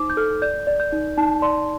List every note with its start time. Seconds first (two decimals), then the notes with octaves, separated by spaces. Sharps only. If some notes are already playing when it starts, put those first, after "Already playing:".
Already playing: D#4 C5 D6
0.10 G6
0.17 A4 F6
0.42 D5 G6
0.67 D5
0.80 G6
0.92 D#4
1.17 D#4 A5
1.42 D5 C6